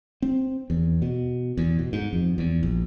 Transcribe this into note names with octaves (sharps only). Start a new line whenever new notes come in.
C4
E2
B2
E2
B2
G#2
F2
E2
A#1